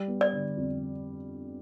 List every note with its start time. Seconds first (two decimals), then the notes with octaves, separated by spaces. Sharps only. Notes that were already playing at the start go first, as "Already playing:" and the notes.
Already playing: G3
0.08 B3
0.21 D5
0.33 D3
0.57 F2